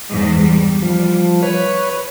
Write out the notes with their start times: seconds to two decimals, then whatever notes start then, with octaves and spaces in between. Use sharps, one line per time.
0.11 E2 G#2
0.43 G3
0.82 F3
1.43 B4 C#5